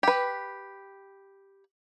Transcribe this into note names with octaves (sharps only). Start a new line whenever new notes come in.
G4 B4